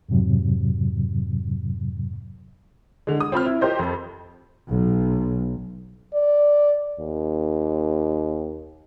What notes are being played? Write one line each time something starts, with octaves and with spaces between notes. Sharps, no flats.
F2 G#2 C3 F#3
D3 G#3
D#6
C4 F4 B5 F6
E4
F4 G4 A#4 C5 D#5
F2
B1
D5
D#2